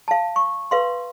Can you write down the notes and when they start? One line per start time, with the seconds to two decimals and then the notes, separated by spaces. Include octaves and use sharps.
0.08 F5 A5
0.36 C#6
0.71 B4 F5 C6